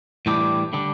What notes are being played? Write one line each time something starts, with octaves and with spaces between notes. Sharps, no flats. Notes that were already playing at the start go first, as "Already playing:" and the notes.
A2 E3 G3 D4 G4
D3 G3 D4